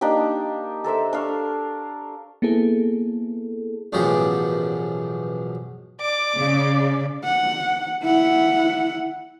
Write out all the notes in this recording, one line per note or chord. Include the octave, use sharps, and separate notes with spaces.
A#3 D4 D#4 G4
A4 A#4 C5 E5
D4 F5 C#6
A#3 B3 E4 G#4 A4
A1 F#2 B2 F3 G4 G#4
D5 D6
C#3
F#5
E4 F#5